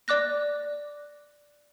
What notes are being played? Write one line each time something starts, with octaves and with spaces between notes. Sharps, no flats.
D5 D6 F#6 A#6